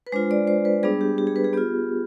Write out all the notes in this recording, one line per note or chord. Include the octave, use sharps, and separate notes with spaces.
B4
G#3 D4 F4 C5
D5
C5
B4
G3 B3 D4 G#4
G4
G4
G#4
B4
G#4
B3 F4 G4